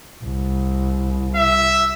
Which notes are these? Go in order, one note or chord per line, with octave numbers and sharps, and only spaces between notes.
C2
E5